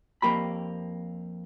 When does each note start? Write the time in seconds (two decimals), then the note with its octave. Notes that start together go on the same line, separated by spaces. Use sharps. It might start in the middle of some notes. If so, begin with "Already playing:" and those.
0.22 F2 A#3 G4 B5